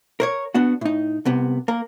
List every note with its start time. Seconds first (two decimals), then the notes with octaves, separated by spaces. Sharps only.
0.20 A#4 C5 C#5
0.54 B3 D4 F#4
0.81 A2 D#4
1.25 C2 C3 B3
1.68 A#3 A#4